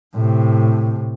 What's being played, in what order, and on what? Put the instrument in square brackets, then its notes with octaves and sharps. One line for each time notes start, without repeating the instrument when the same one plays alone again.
[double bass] A2 C3